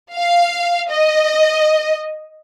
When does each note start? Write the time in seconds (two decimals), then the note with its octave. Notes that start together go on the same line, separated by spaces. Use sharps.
0.13 F5
0.90 D#5